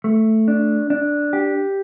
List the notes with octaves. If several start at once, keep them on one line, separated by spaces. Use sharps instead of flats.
A3
D4
D4
G4